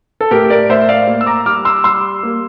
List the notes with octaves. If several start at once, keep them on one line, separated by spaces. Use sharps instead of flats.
A4
A2 G4 A#4
A#4 D5
A2 C5 E5
D5 F5
A#3
E6
A#5 D6
G3 D6 F6
C6 E6
G3 C6 E6
A#3